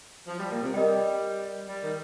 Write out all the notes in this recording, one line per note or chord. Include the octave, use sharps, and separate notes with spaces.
F3
G3
A#2
C3
G3 A#4 D#5 G5
G3
D#3